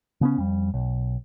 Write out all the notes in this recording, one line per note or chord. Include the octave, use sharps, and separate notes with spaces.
C#3 B3 C#4
F2 G3
B1